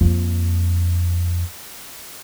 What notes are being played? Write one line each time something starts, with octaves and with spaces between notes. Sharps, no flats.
F2 A#3